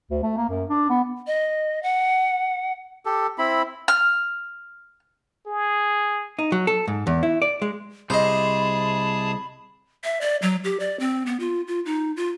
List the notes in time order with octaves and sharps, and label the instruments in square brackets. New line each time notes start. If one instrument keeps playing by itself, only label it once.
[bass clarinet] D2
A3
A#3
F#2
D4
B3
[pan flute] D#5
F#5
[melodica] G4 A4
C4 E4 B5
[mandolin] F6
[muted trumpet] G#4
[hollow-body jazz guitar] D#4
F#3
A4
G#2
E2
E4
D5
G#3
[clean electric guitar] C2 C3 [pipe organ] G#4 A5 [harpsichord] C5 D#5 [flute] B5
[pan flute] E5
D5
F#3
G4
D5
C4
B3
F4
F4
D#4
F4